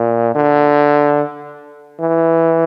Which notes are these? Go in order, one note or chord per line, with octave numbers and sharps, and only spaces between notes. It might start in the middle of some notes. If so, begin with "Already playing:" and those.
Already playing: A#2
D3
E3